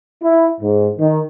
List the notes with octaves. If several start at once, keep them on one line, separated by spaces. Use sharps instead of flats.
E4
G#2
D#3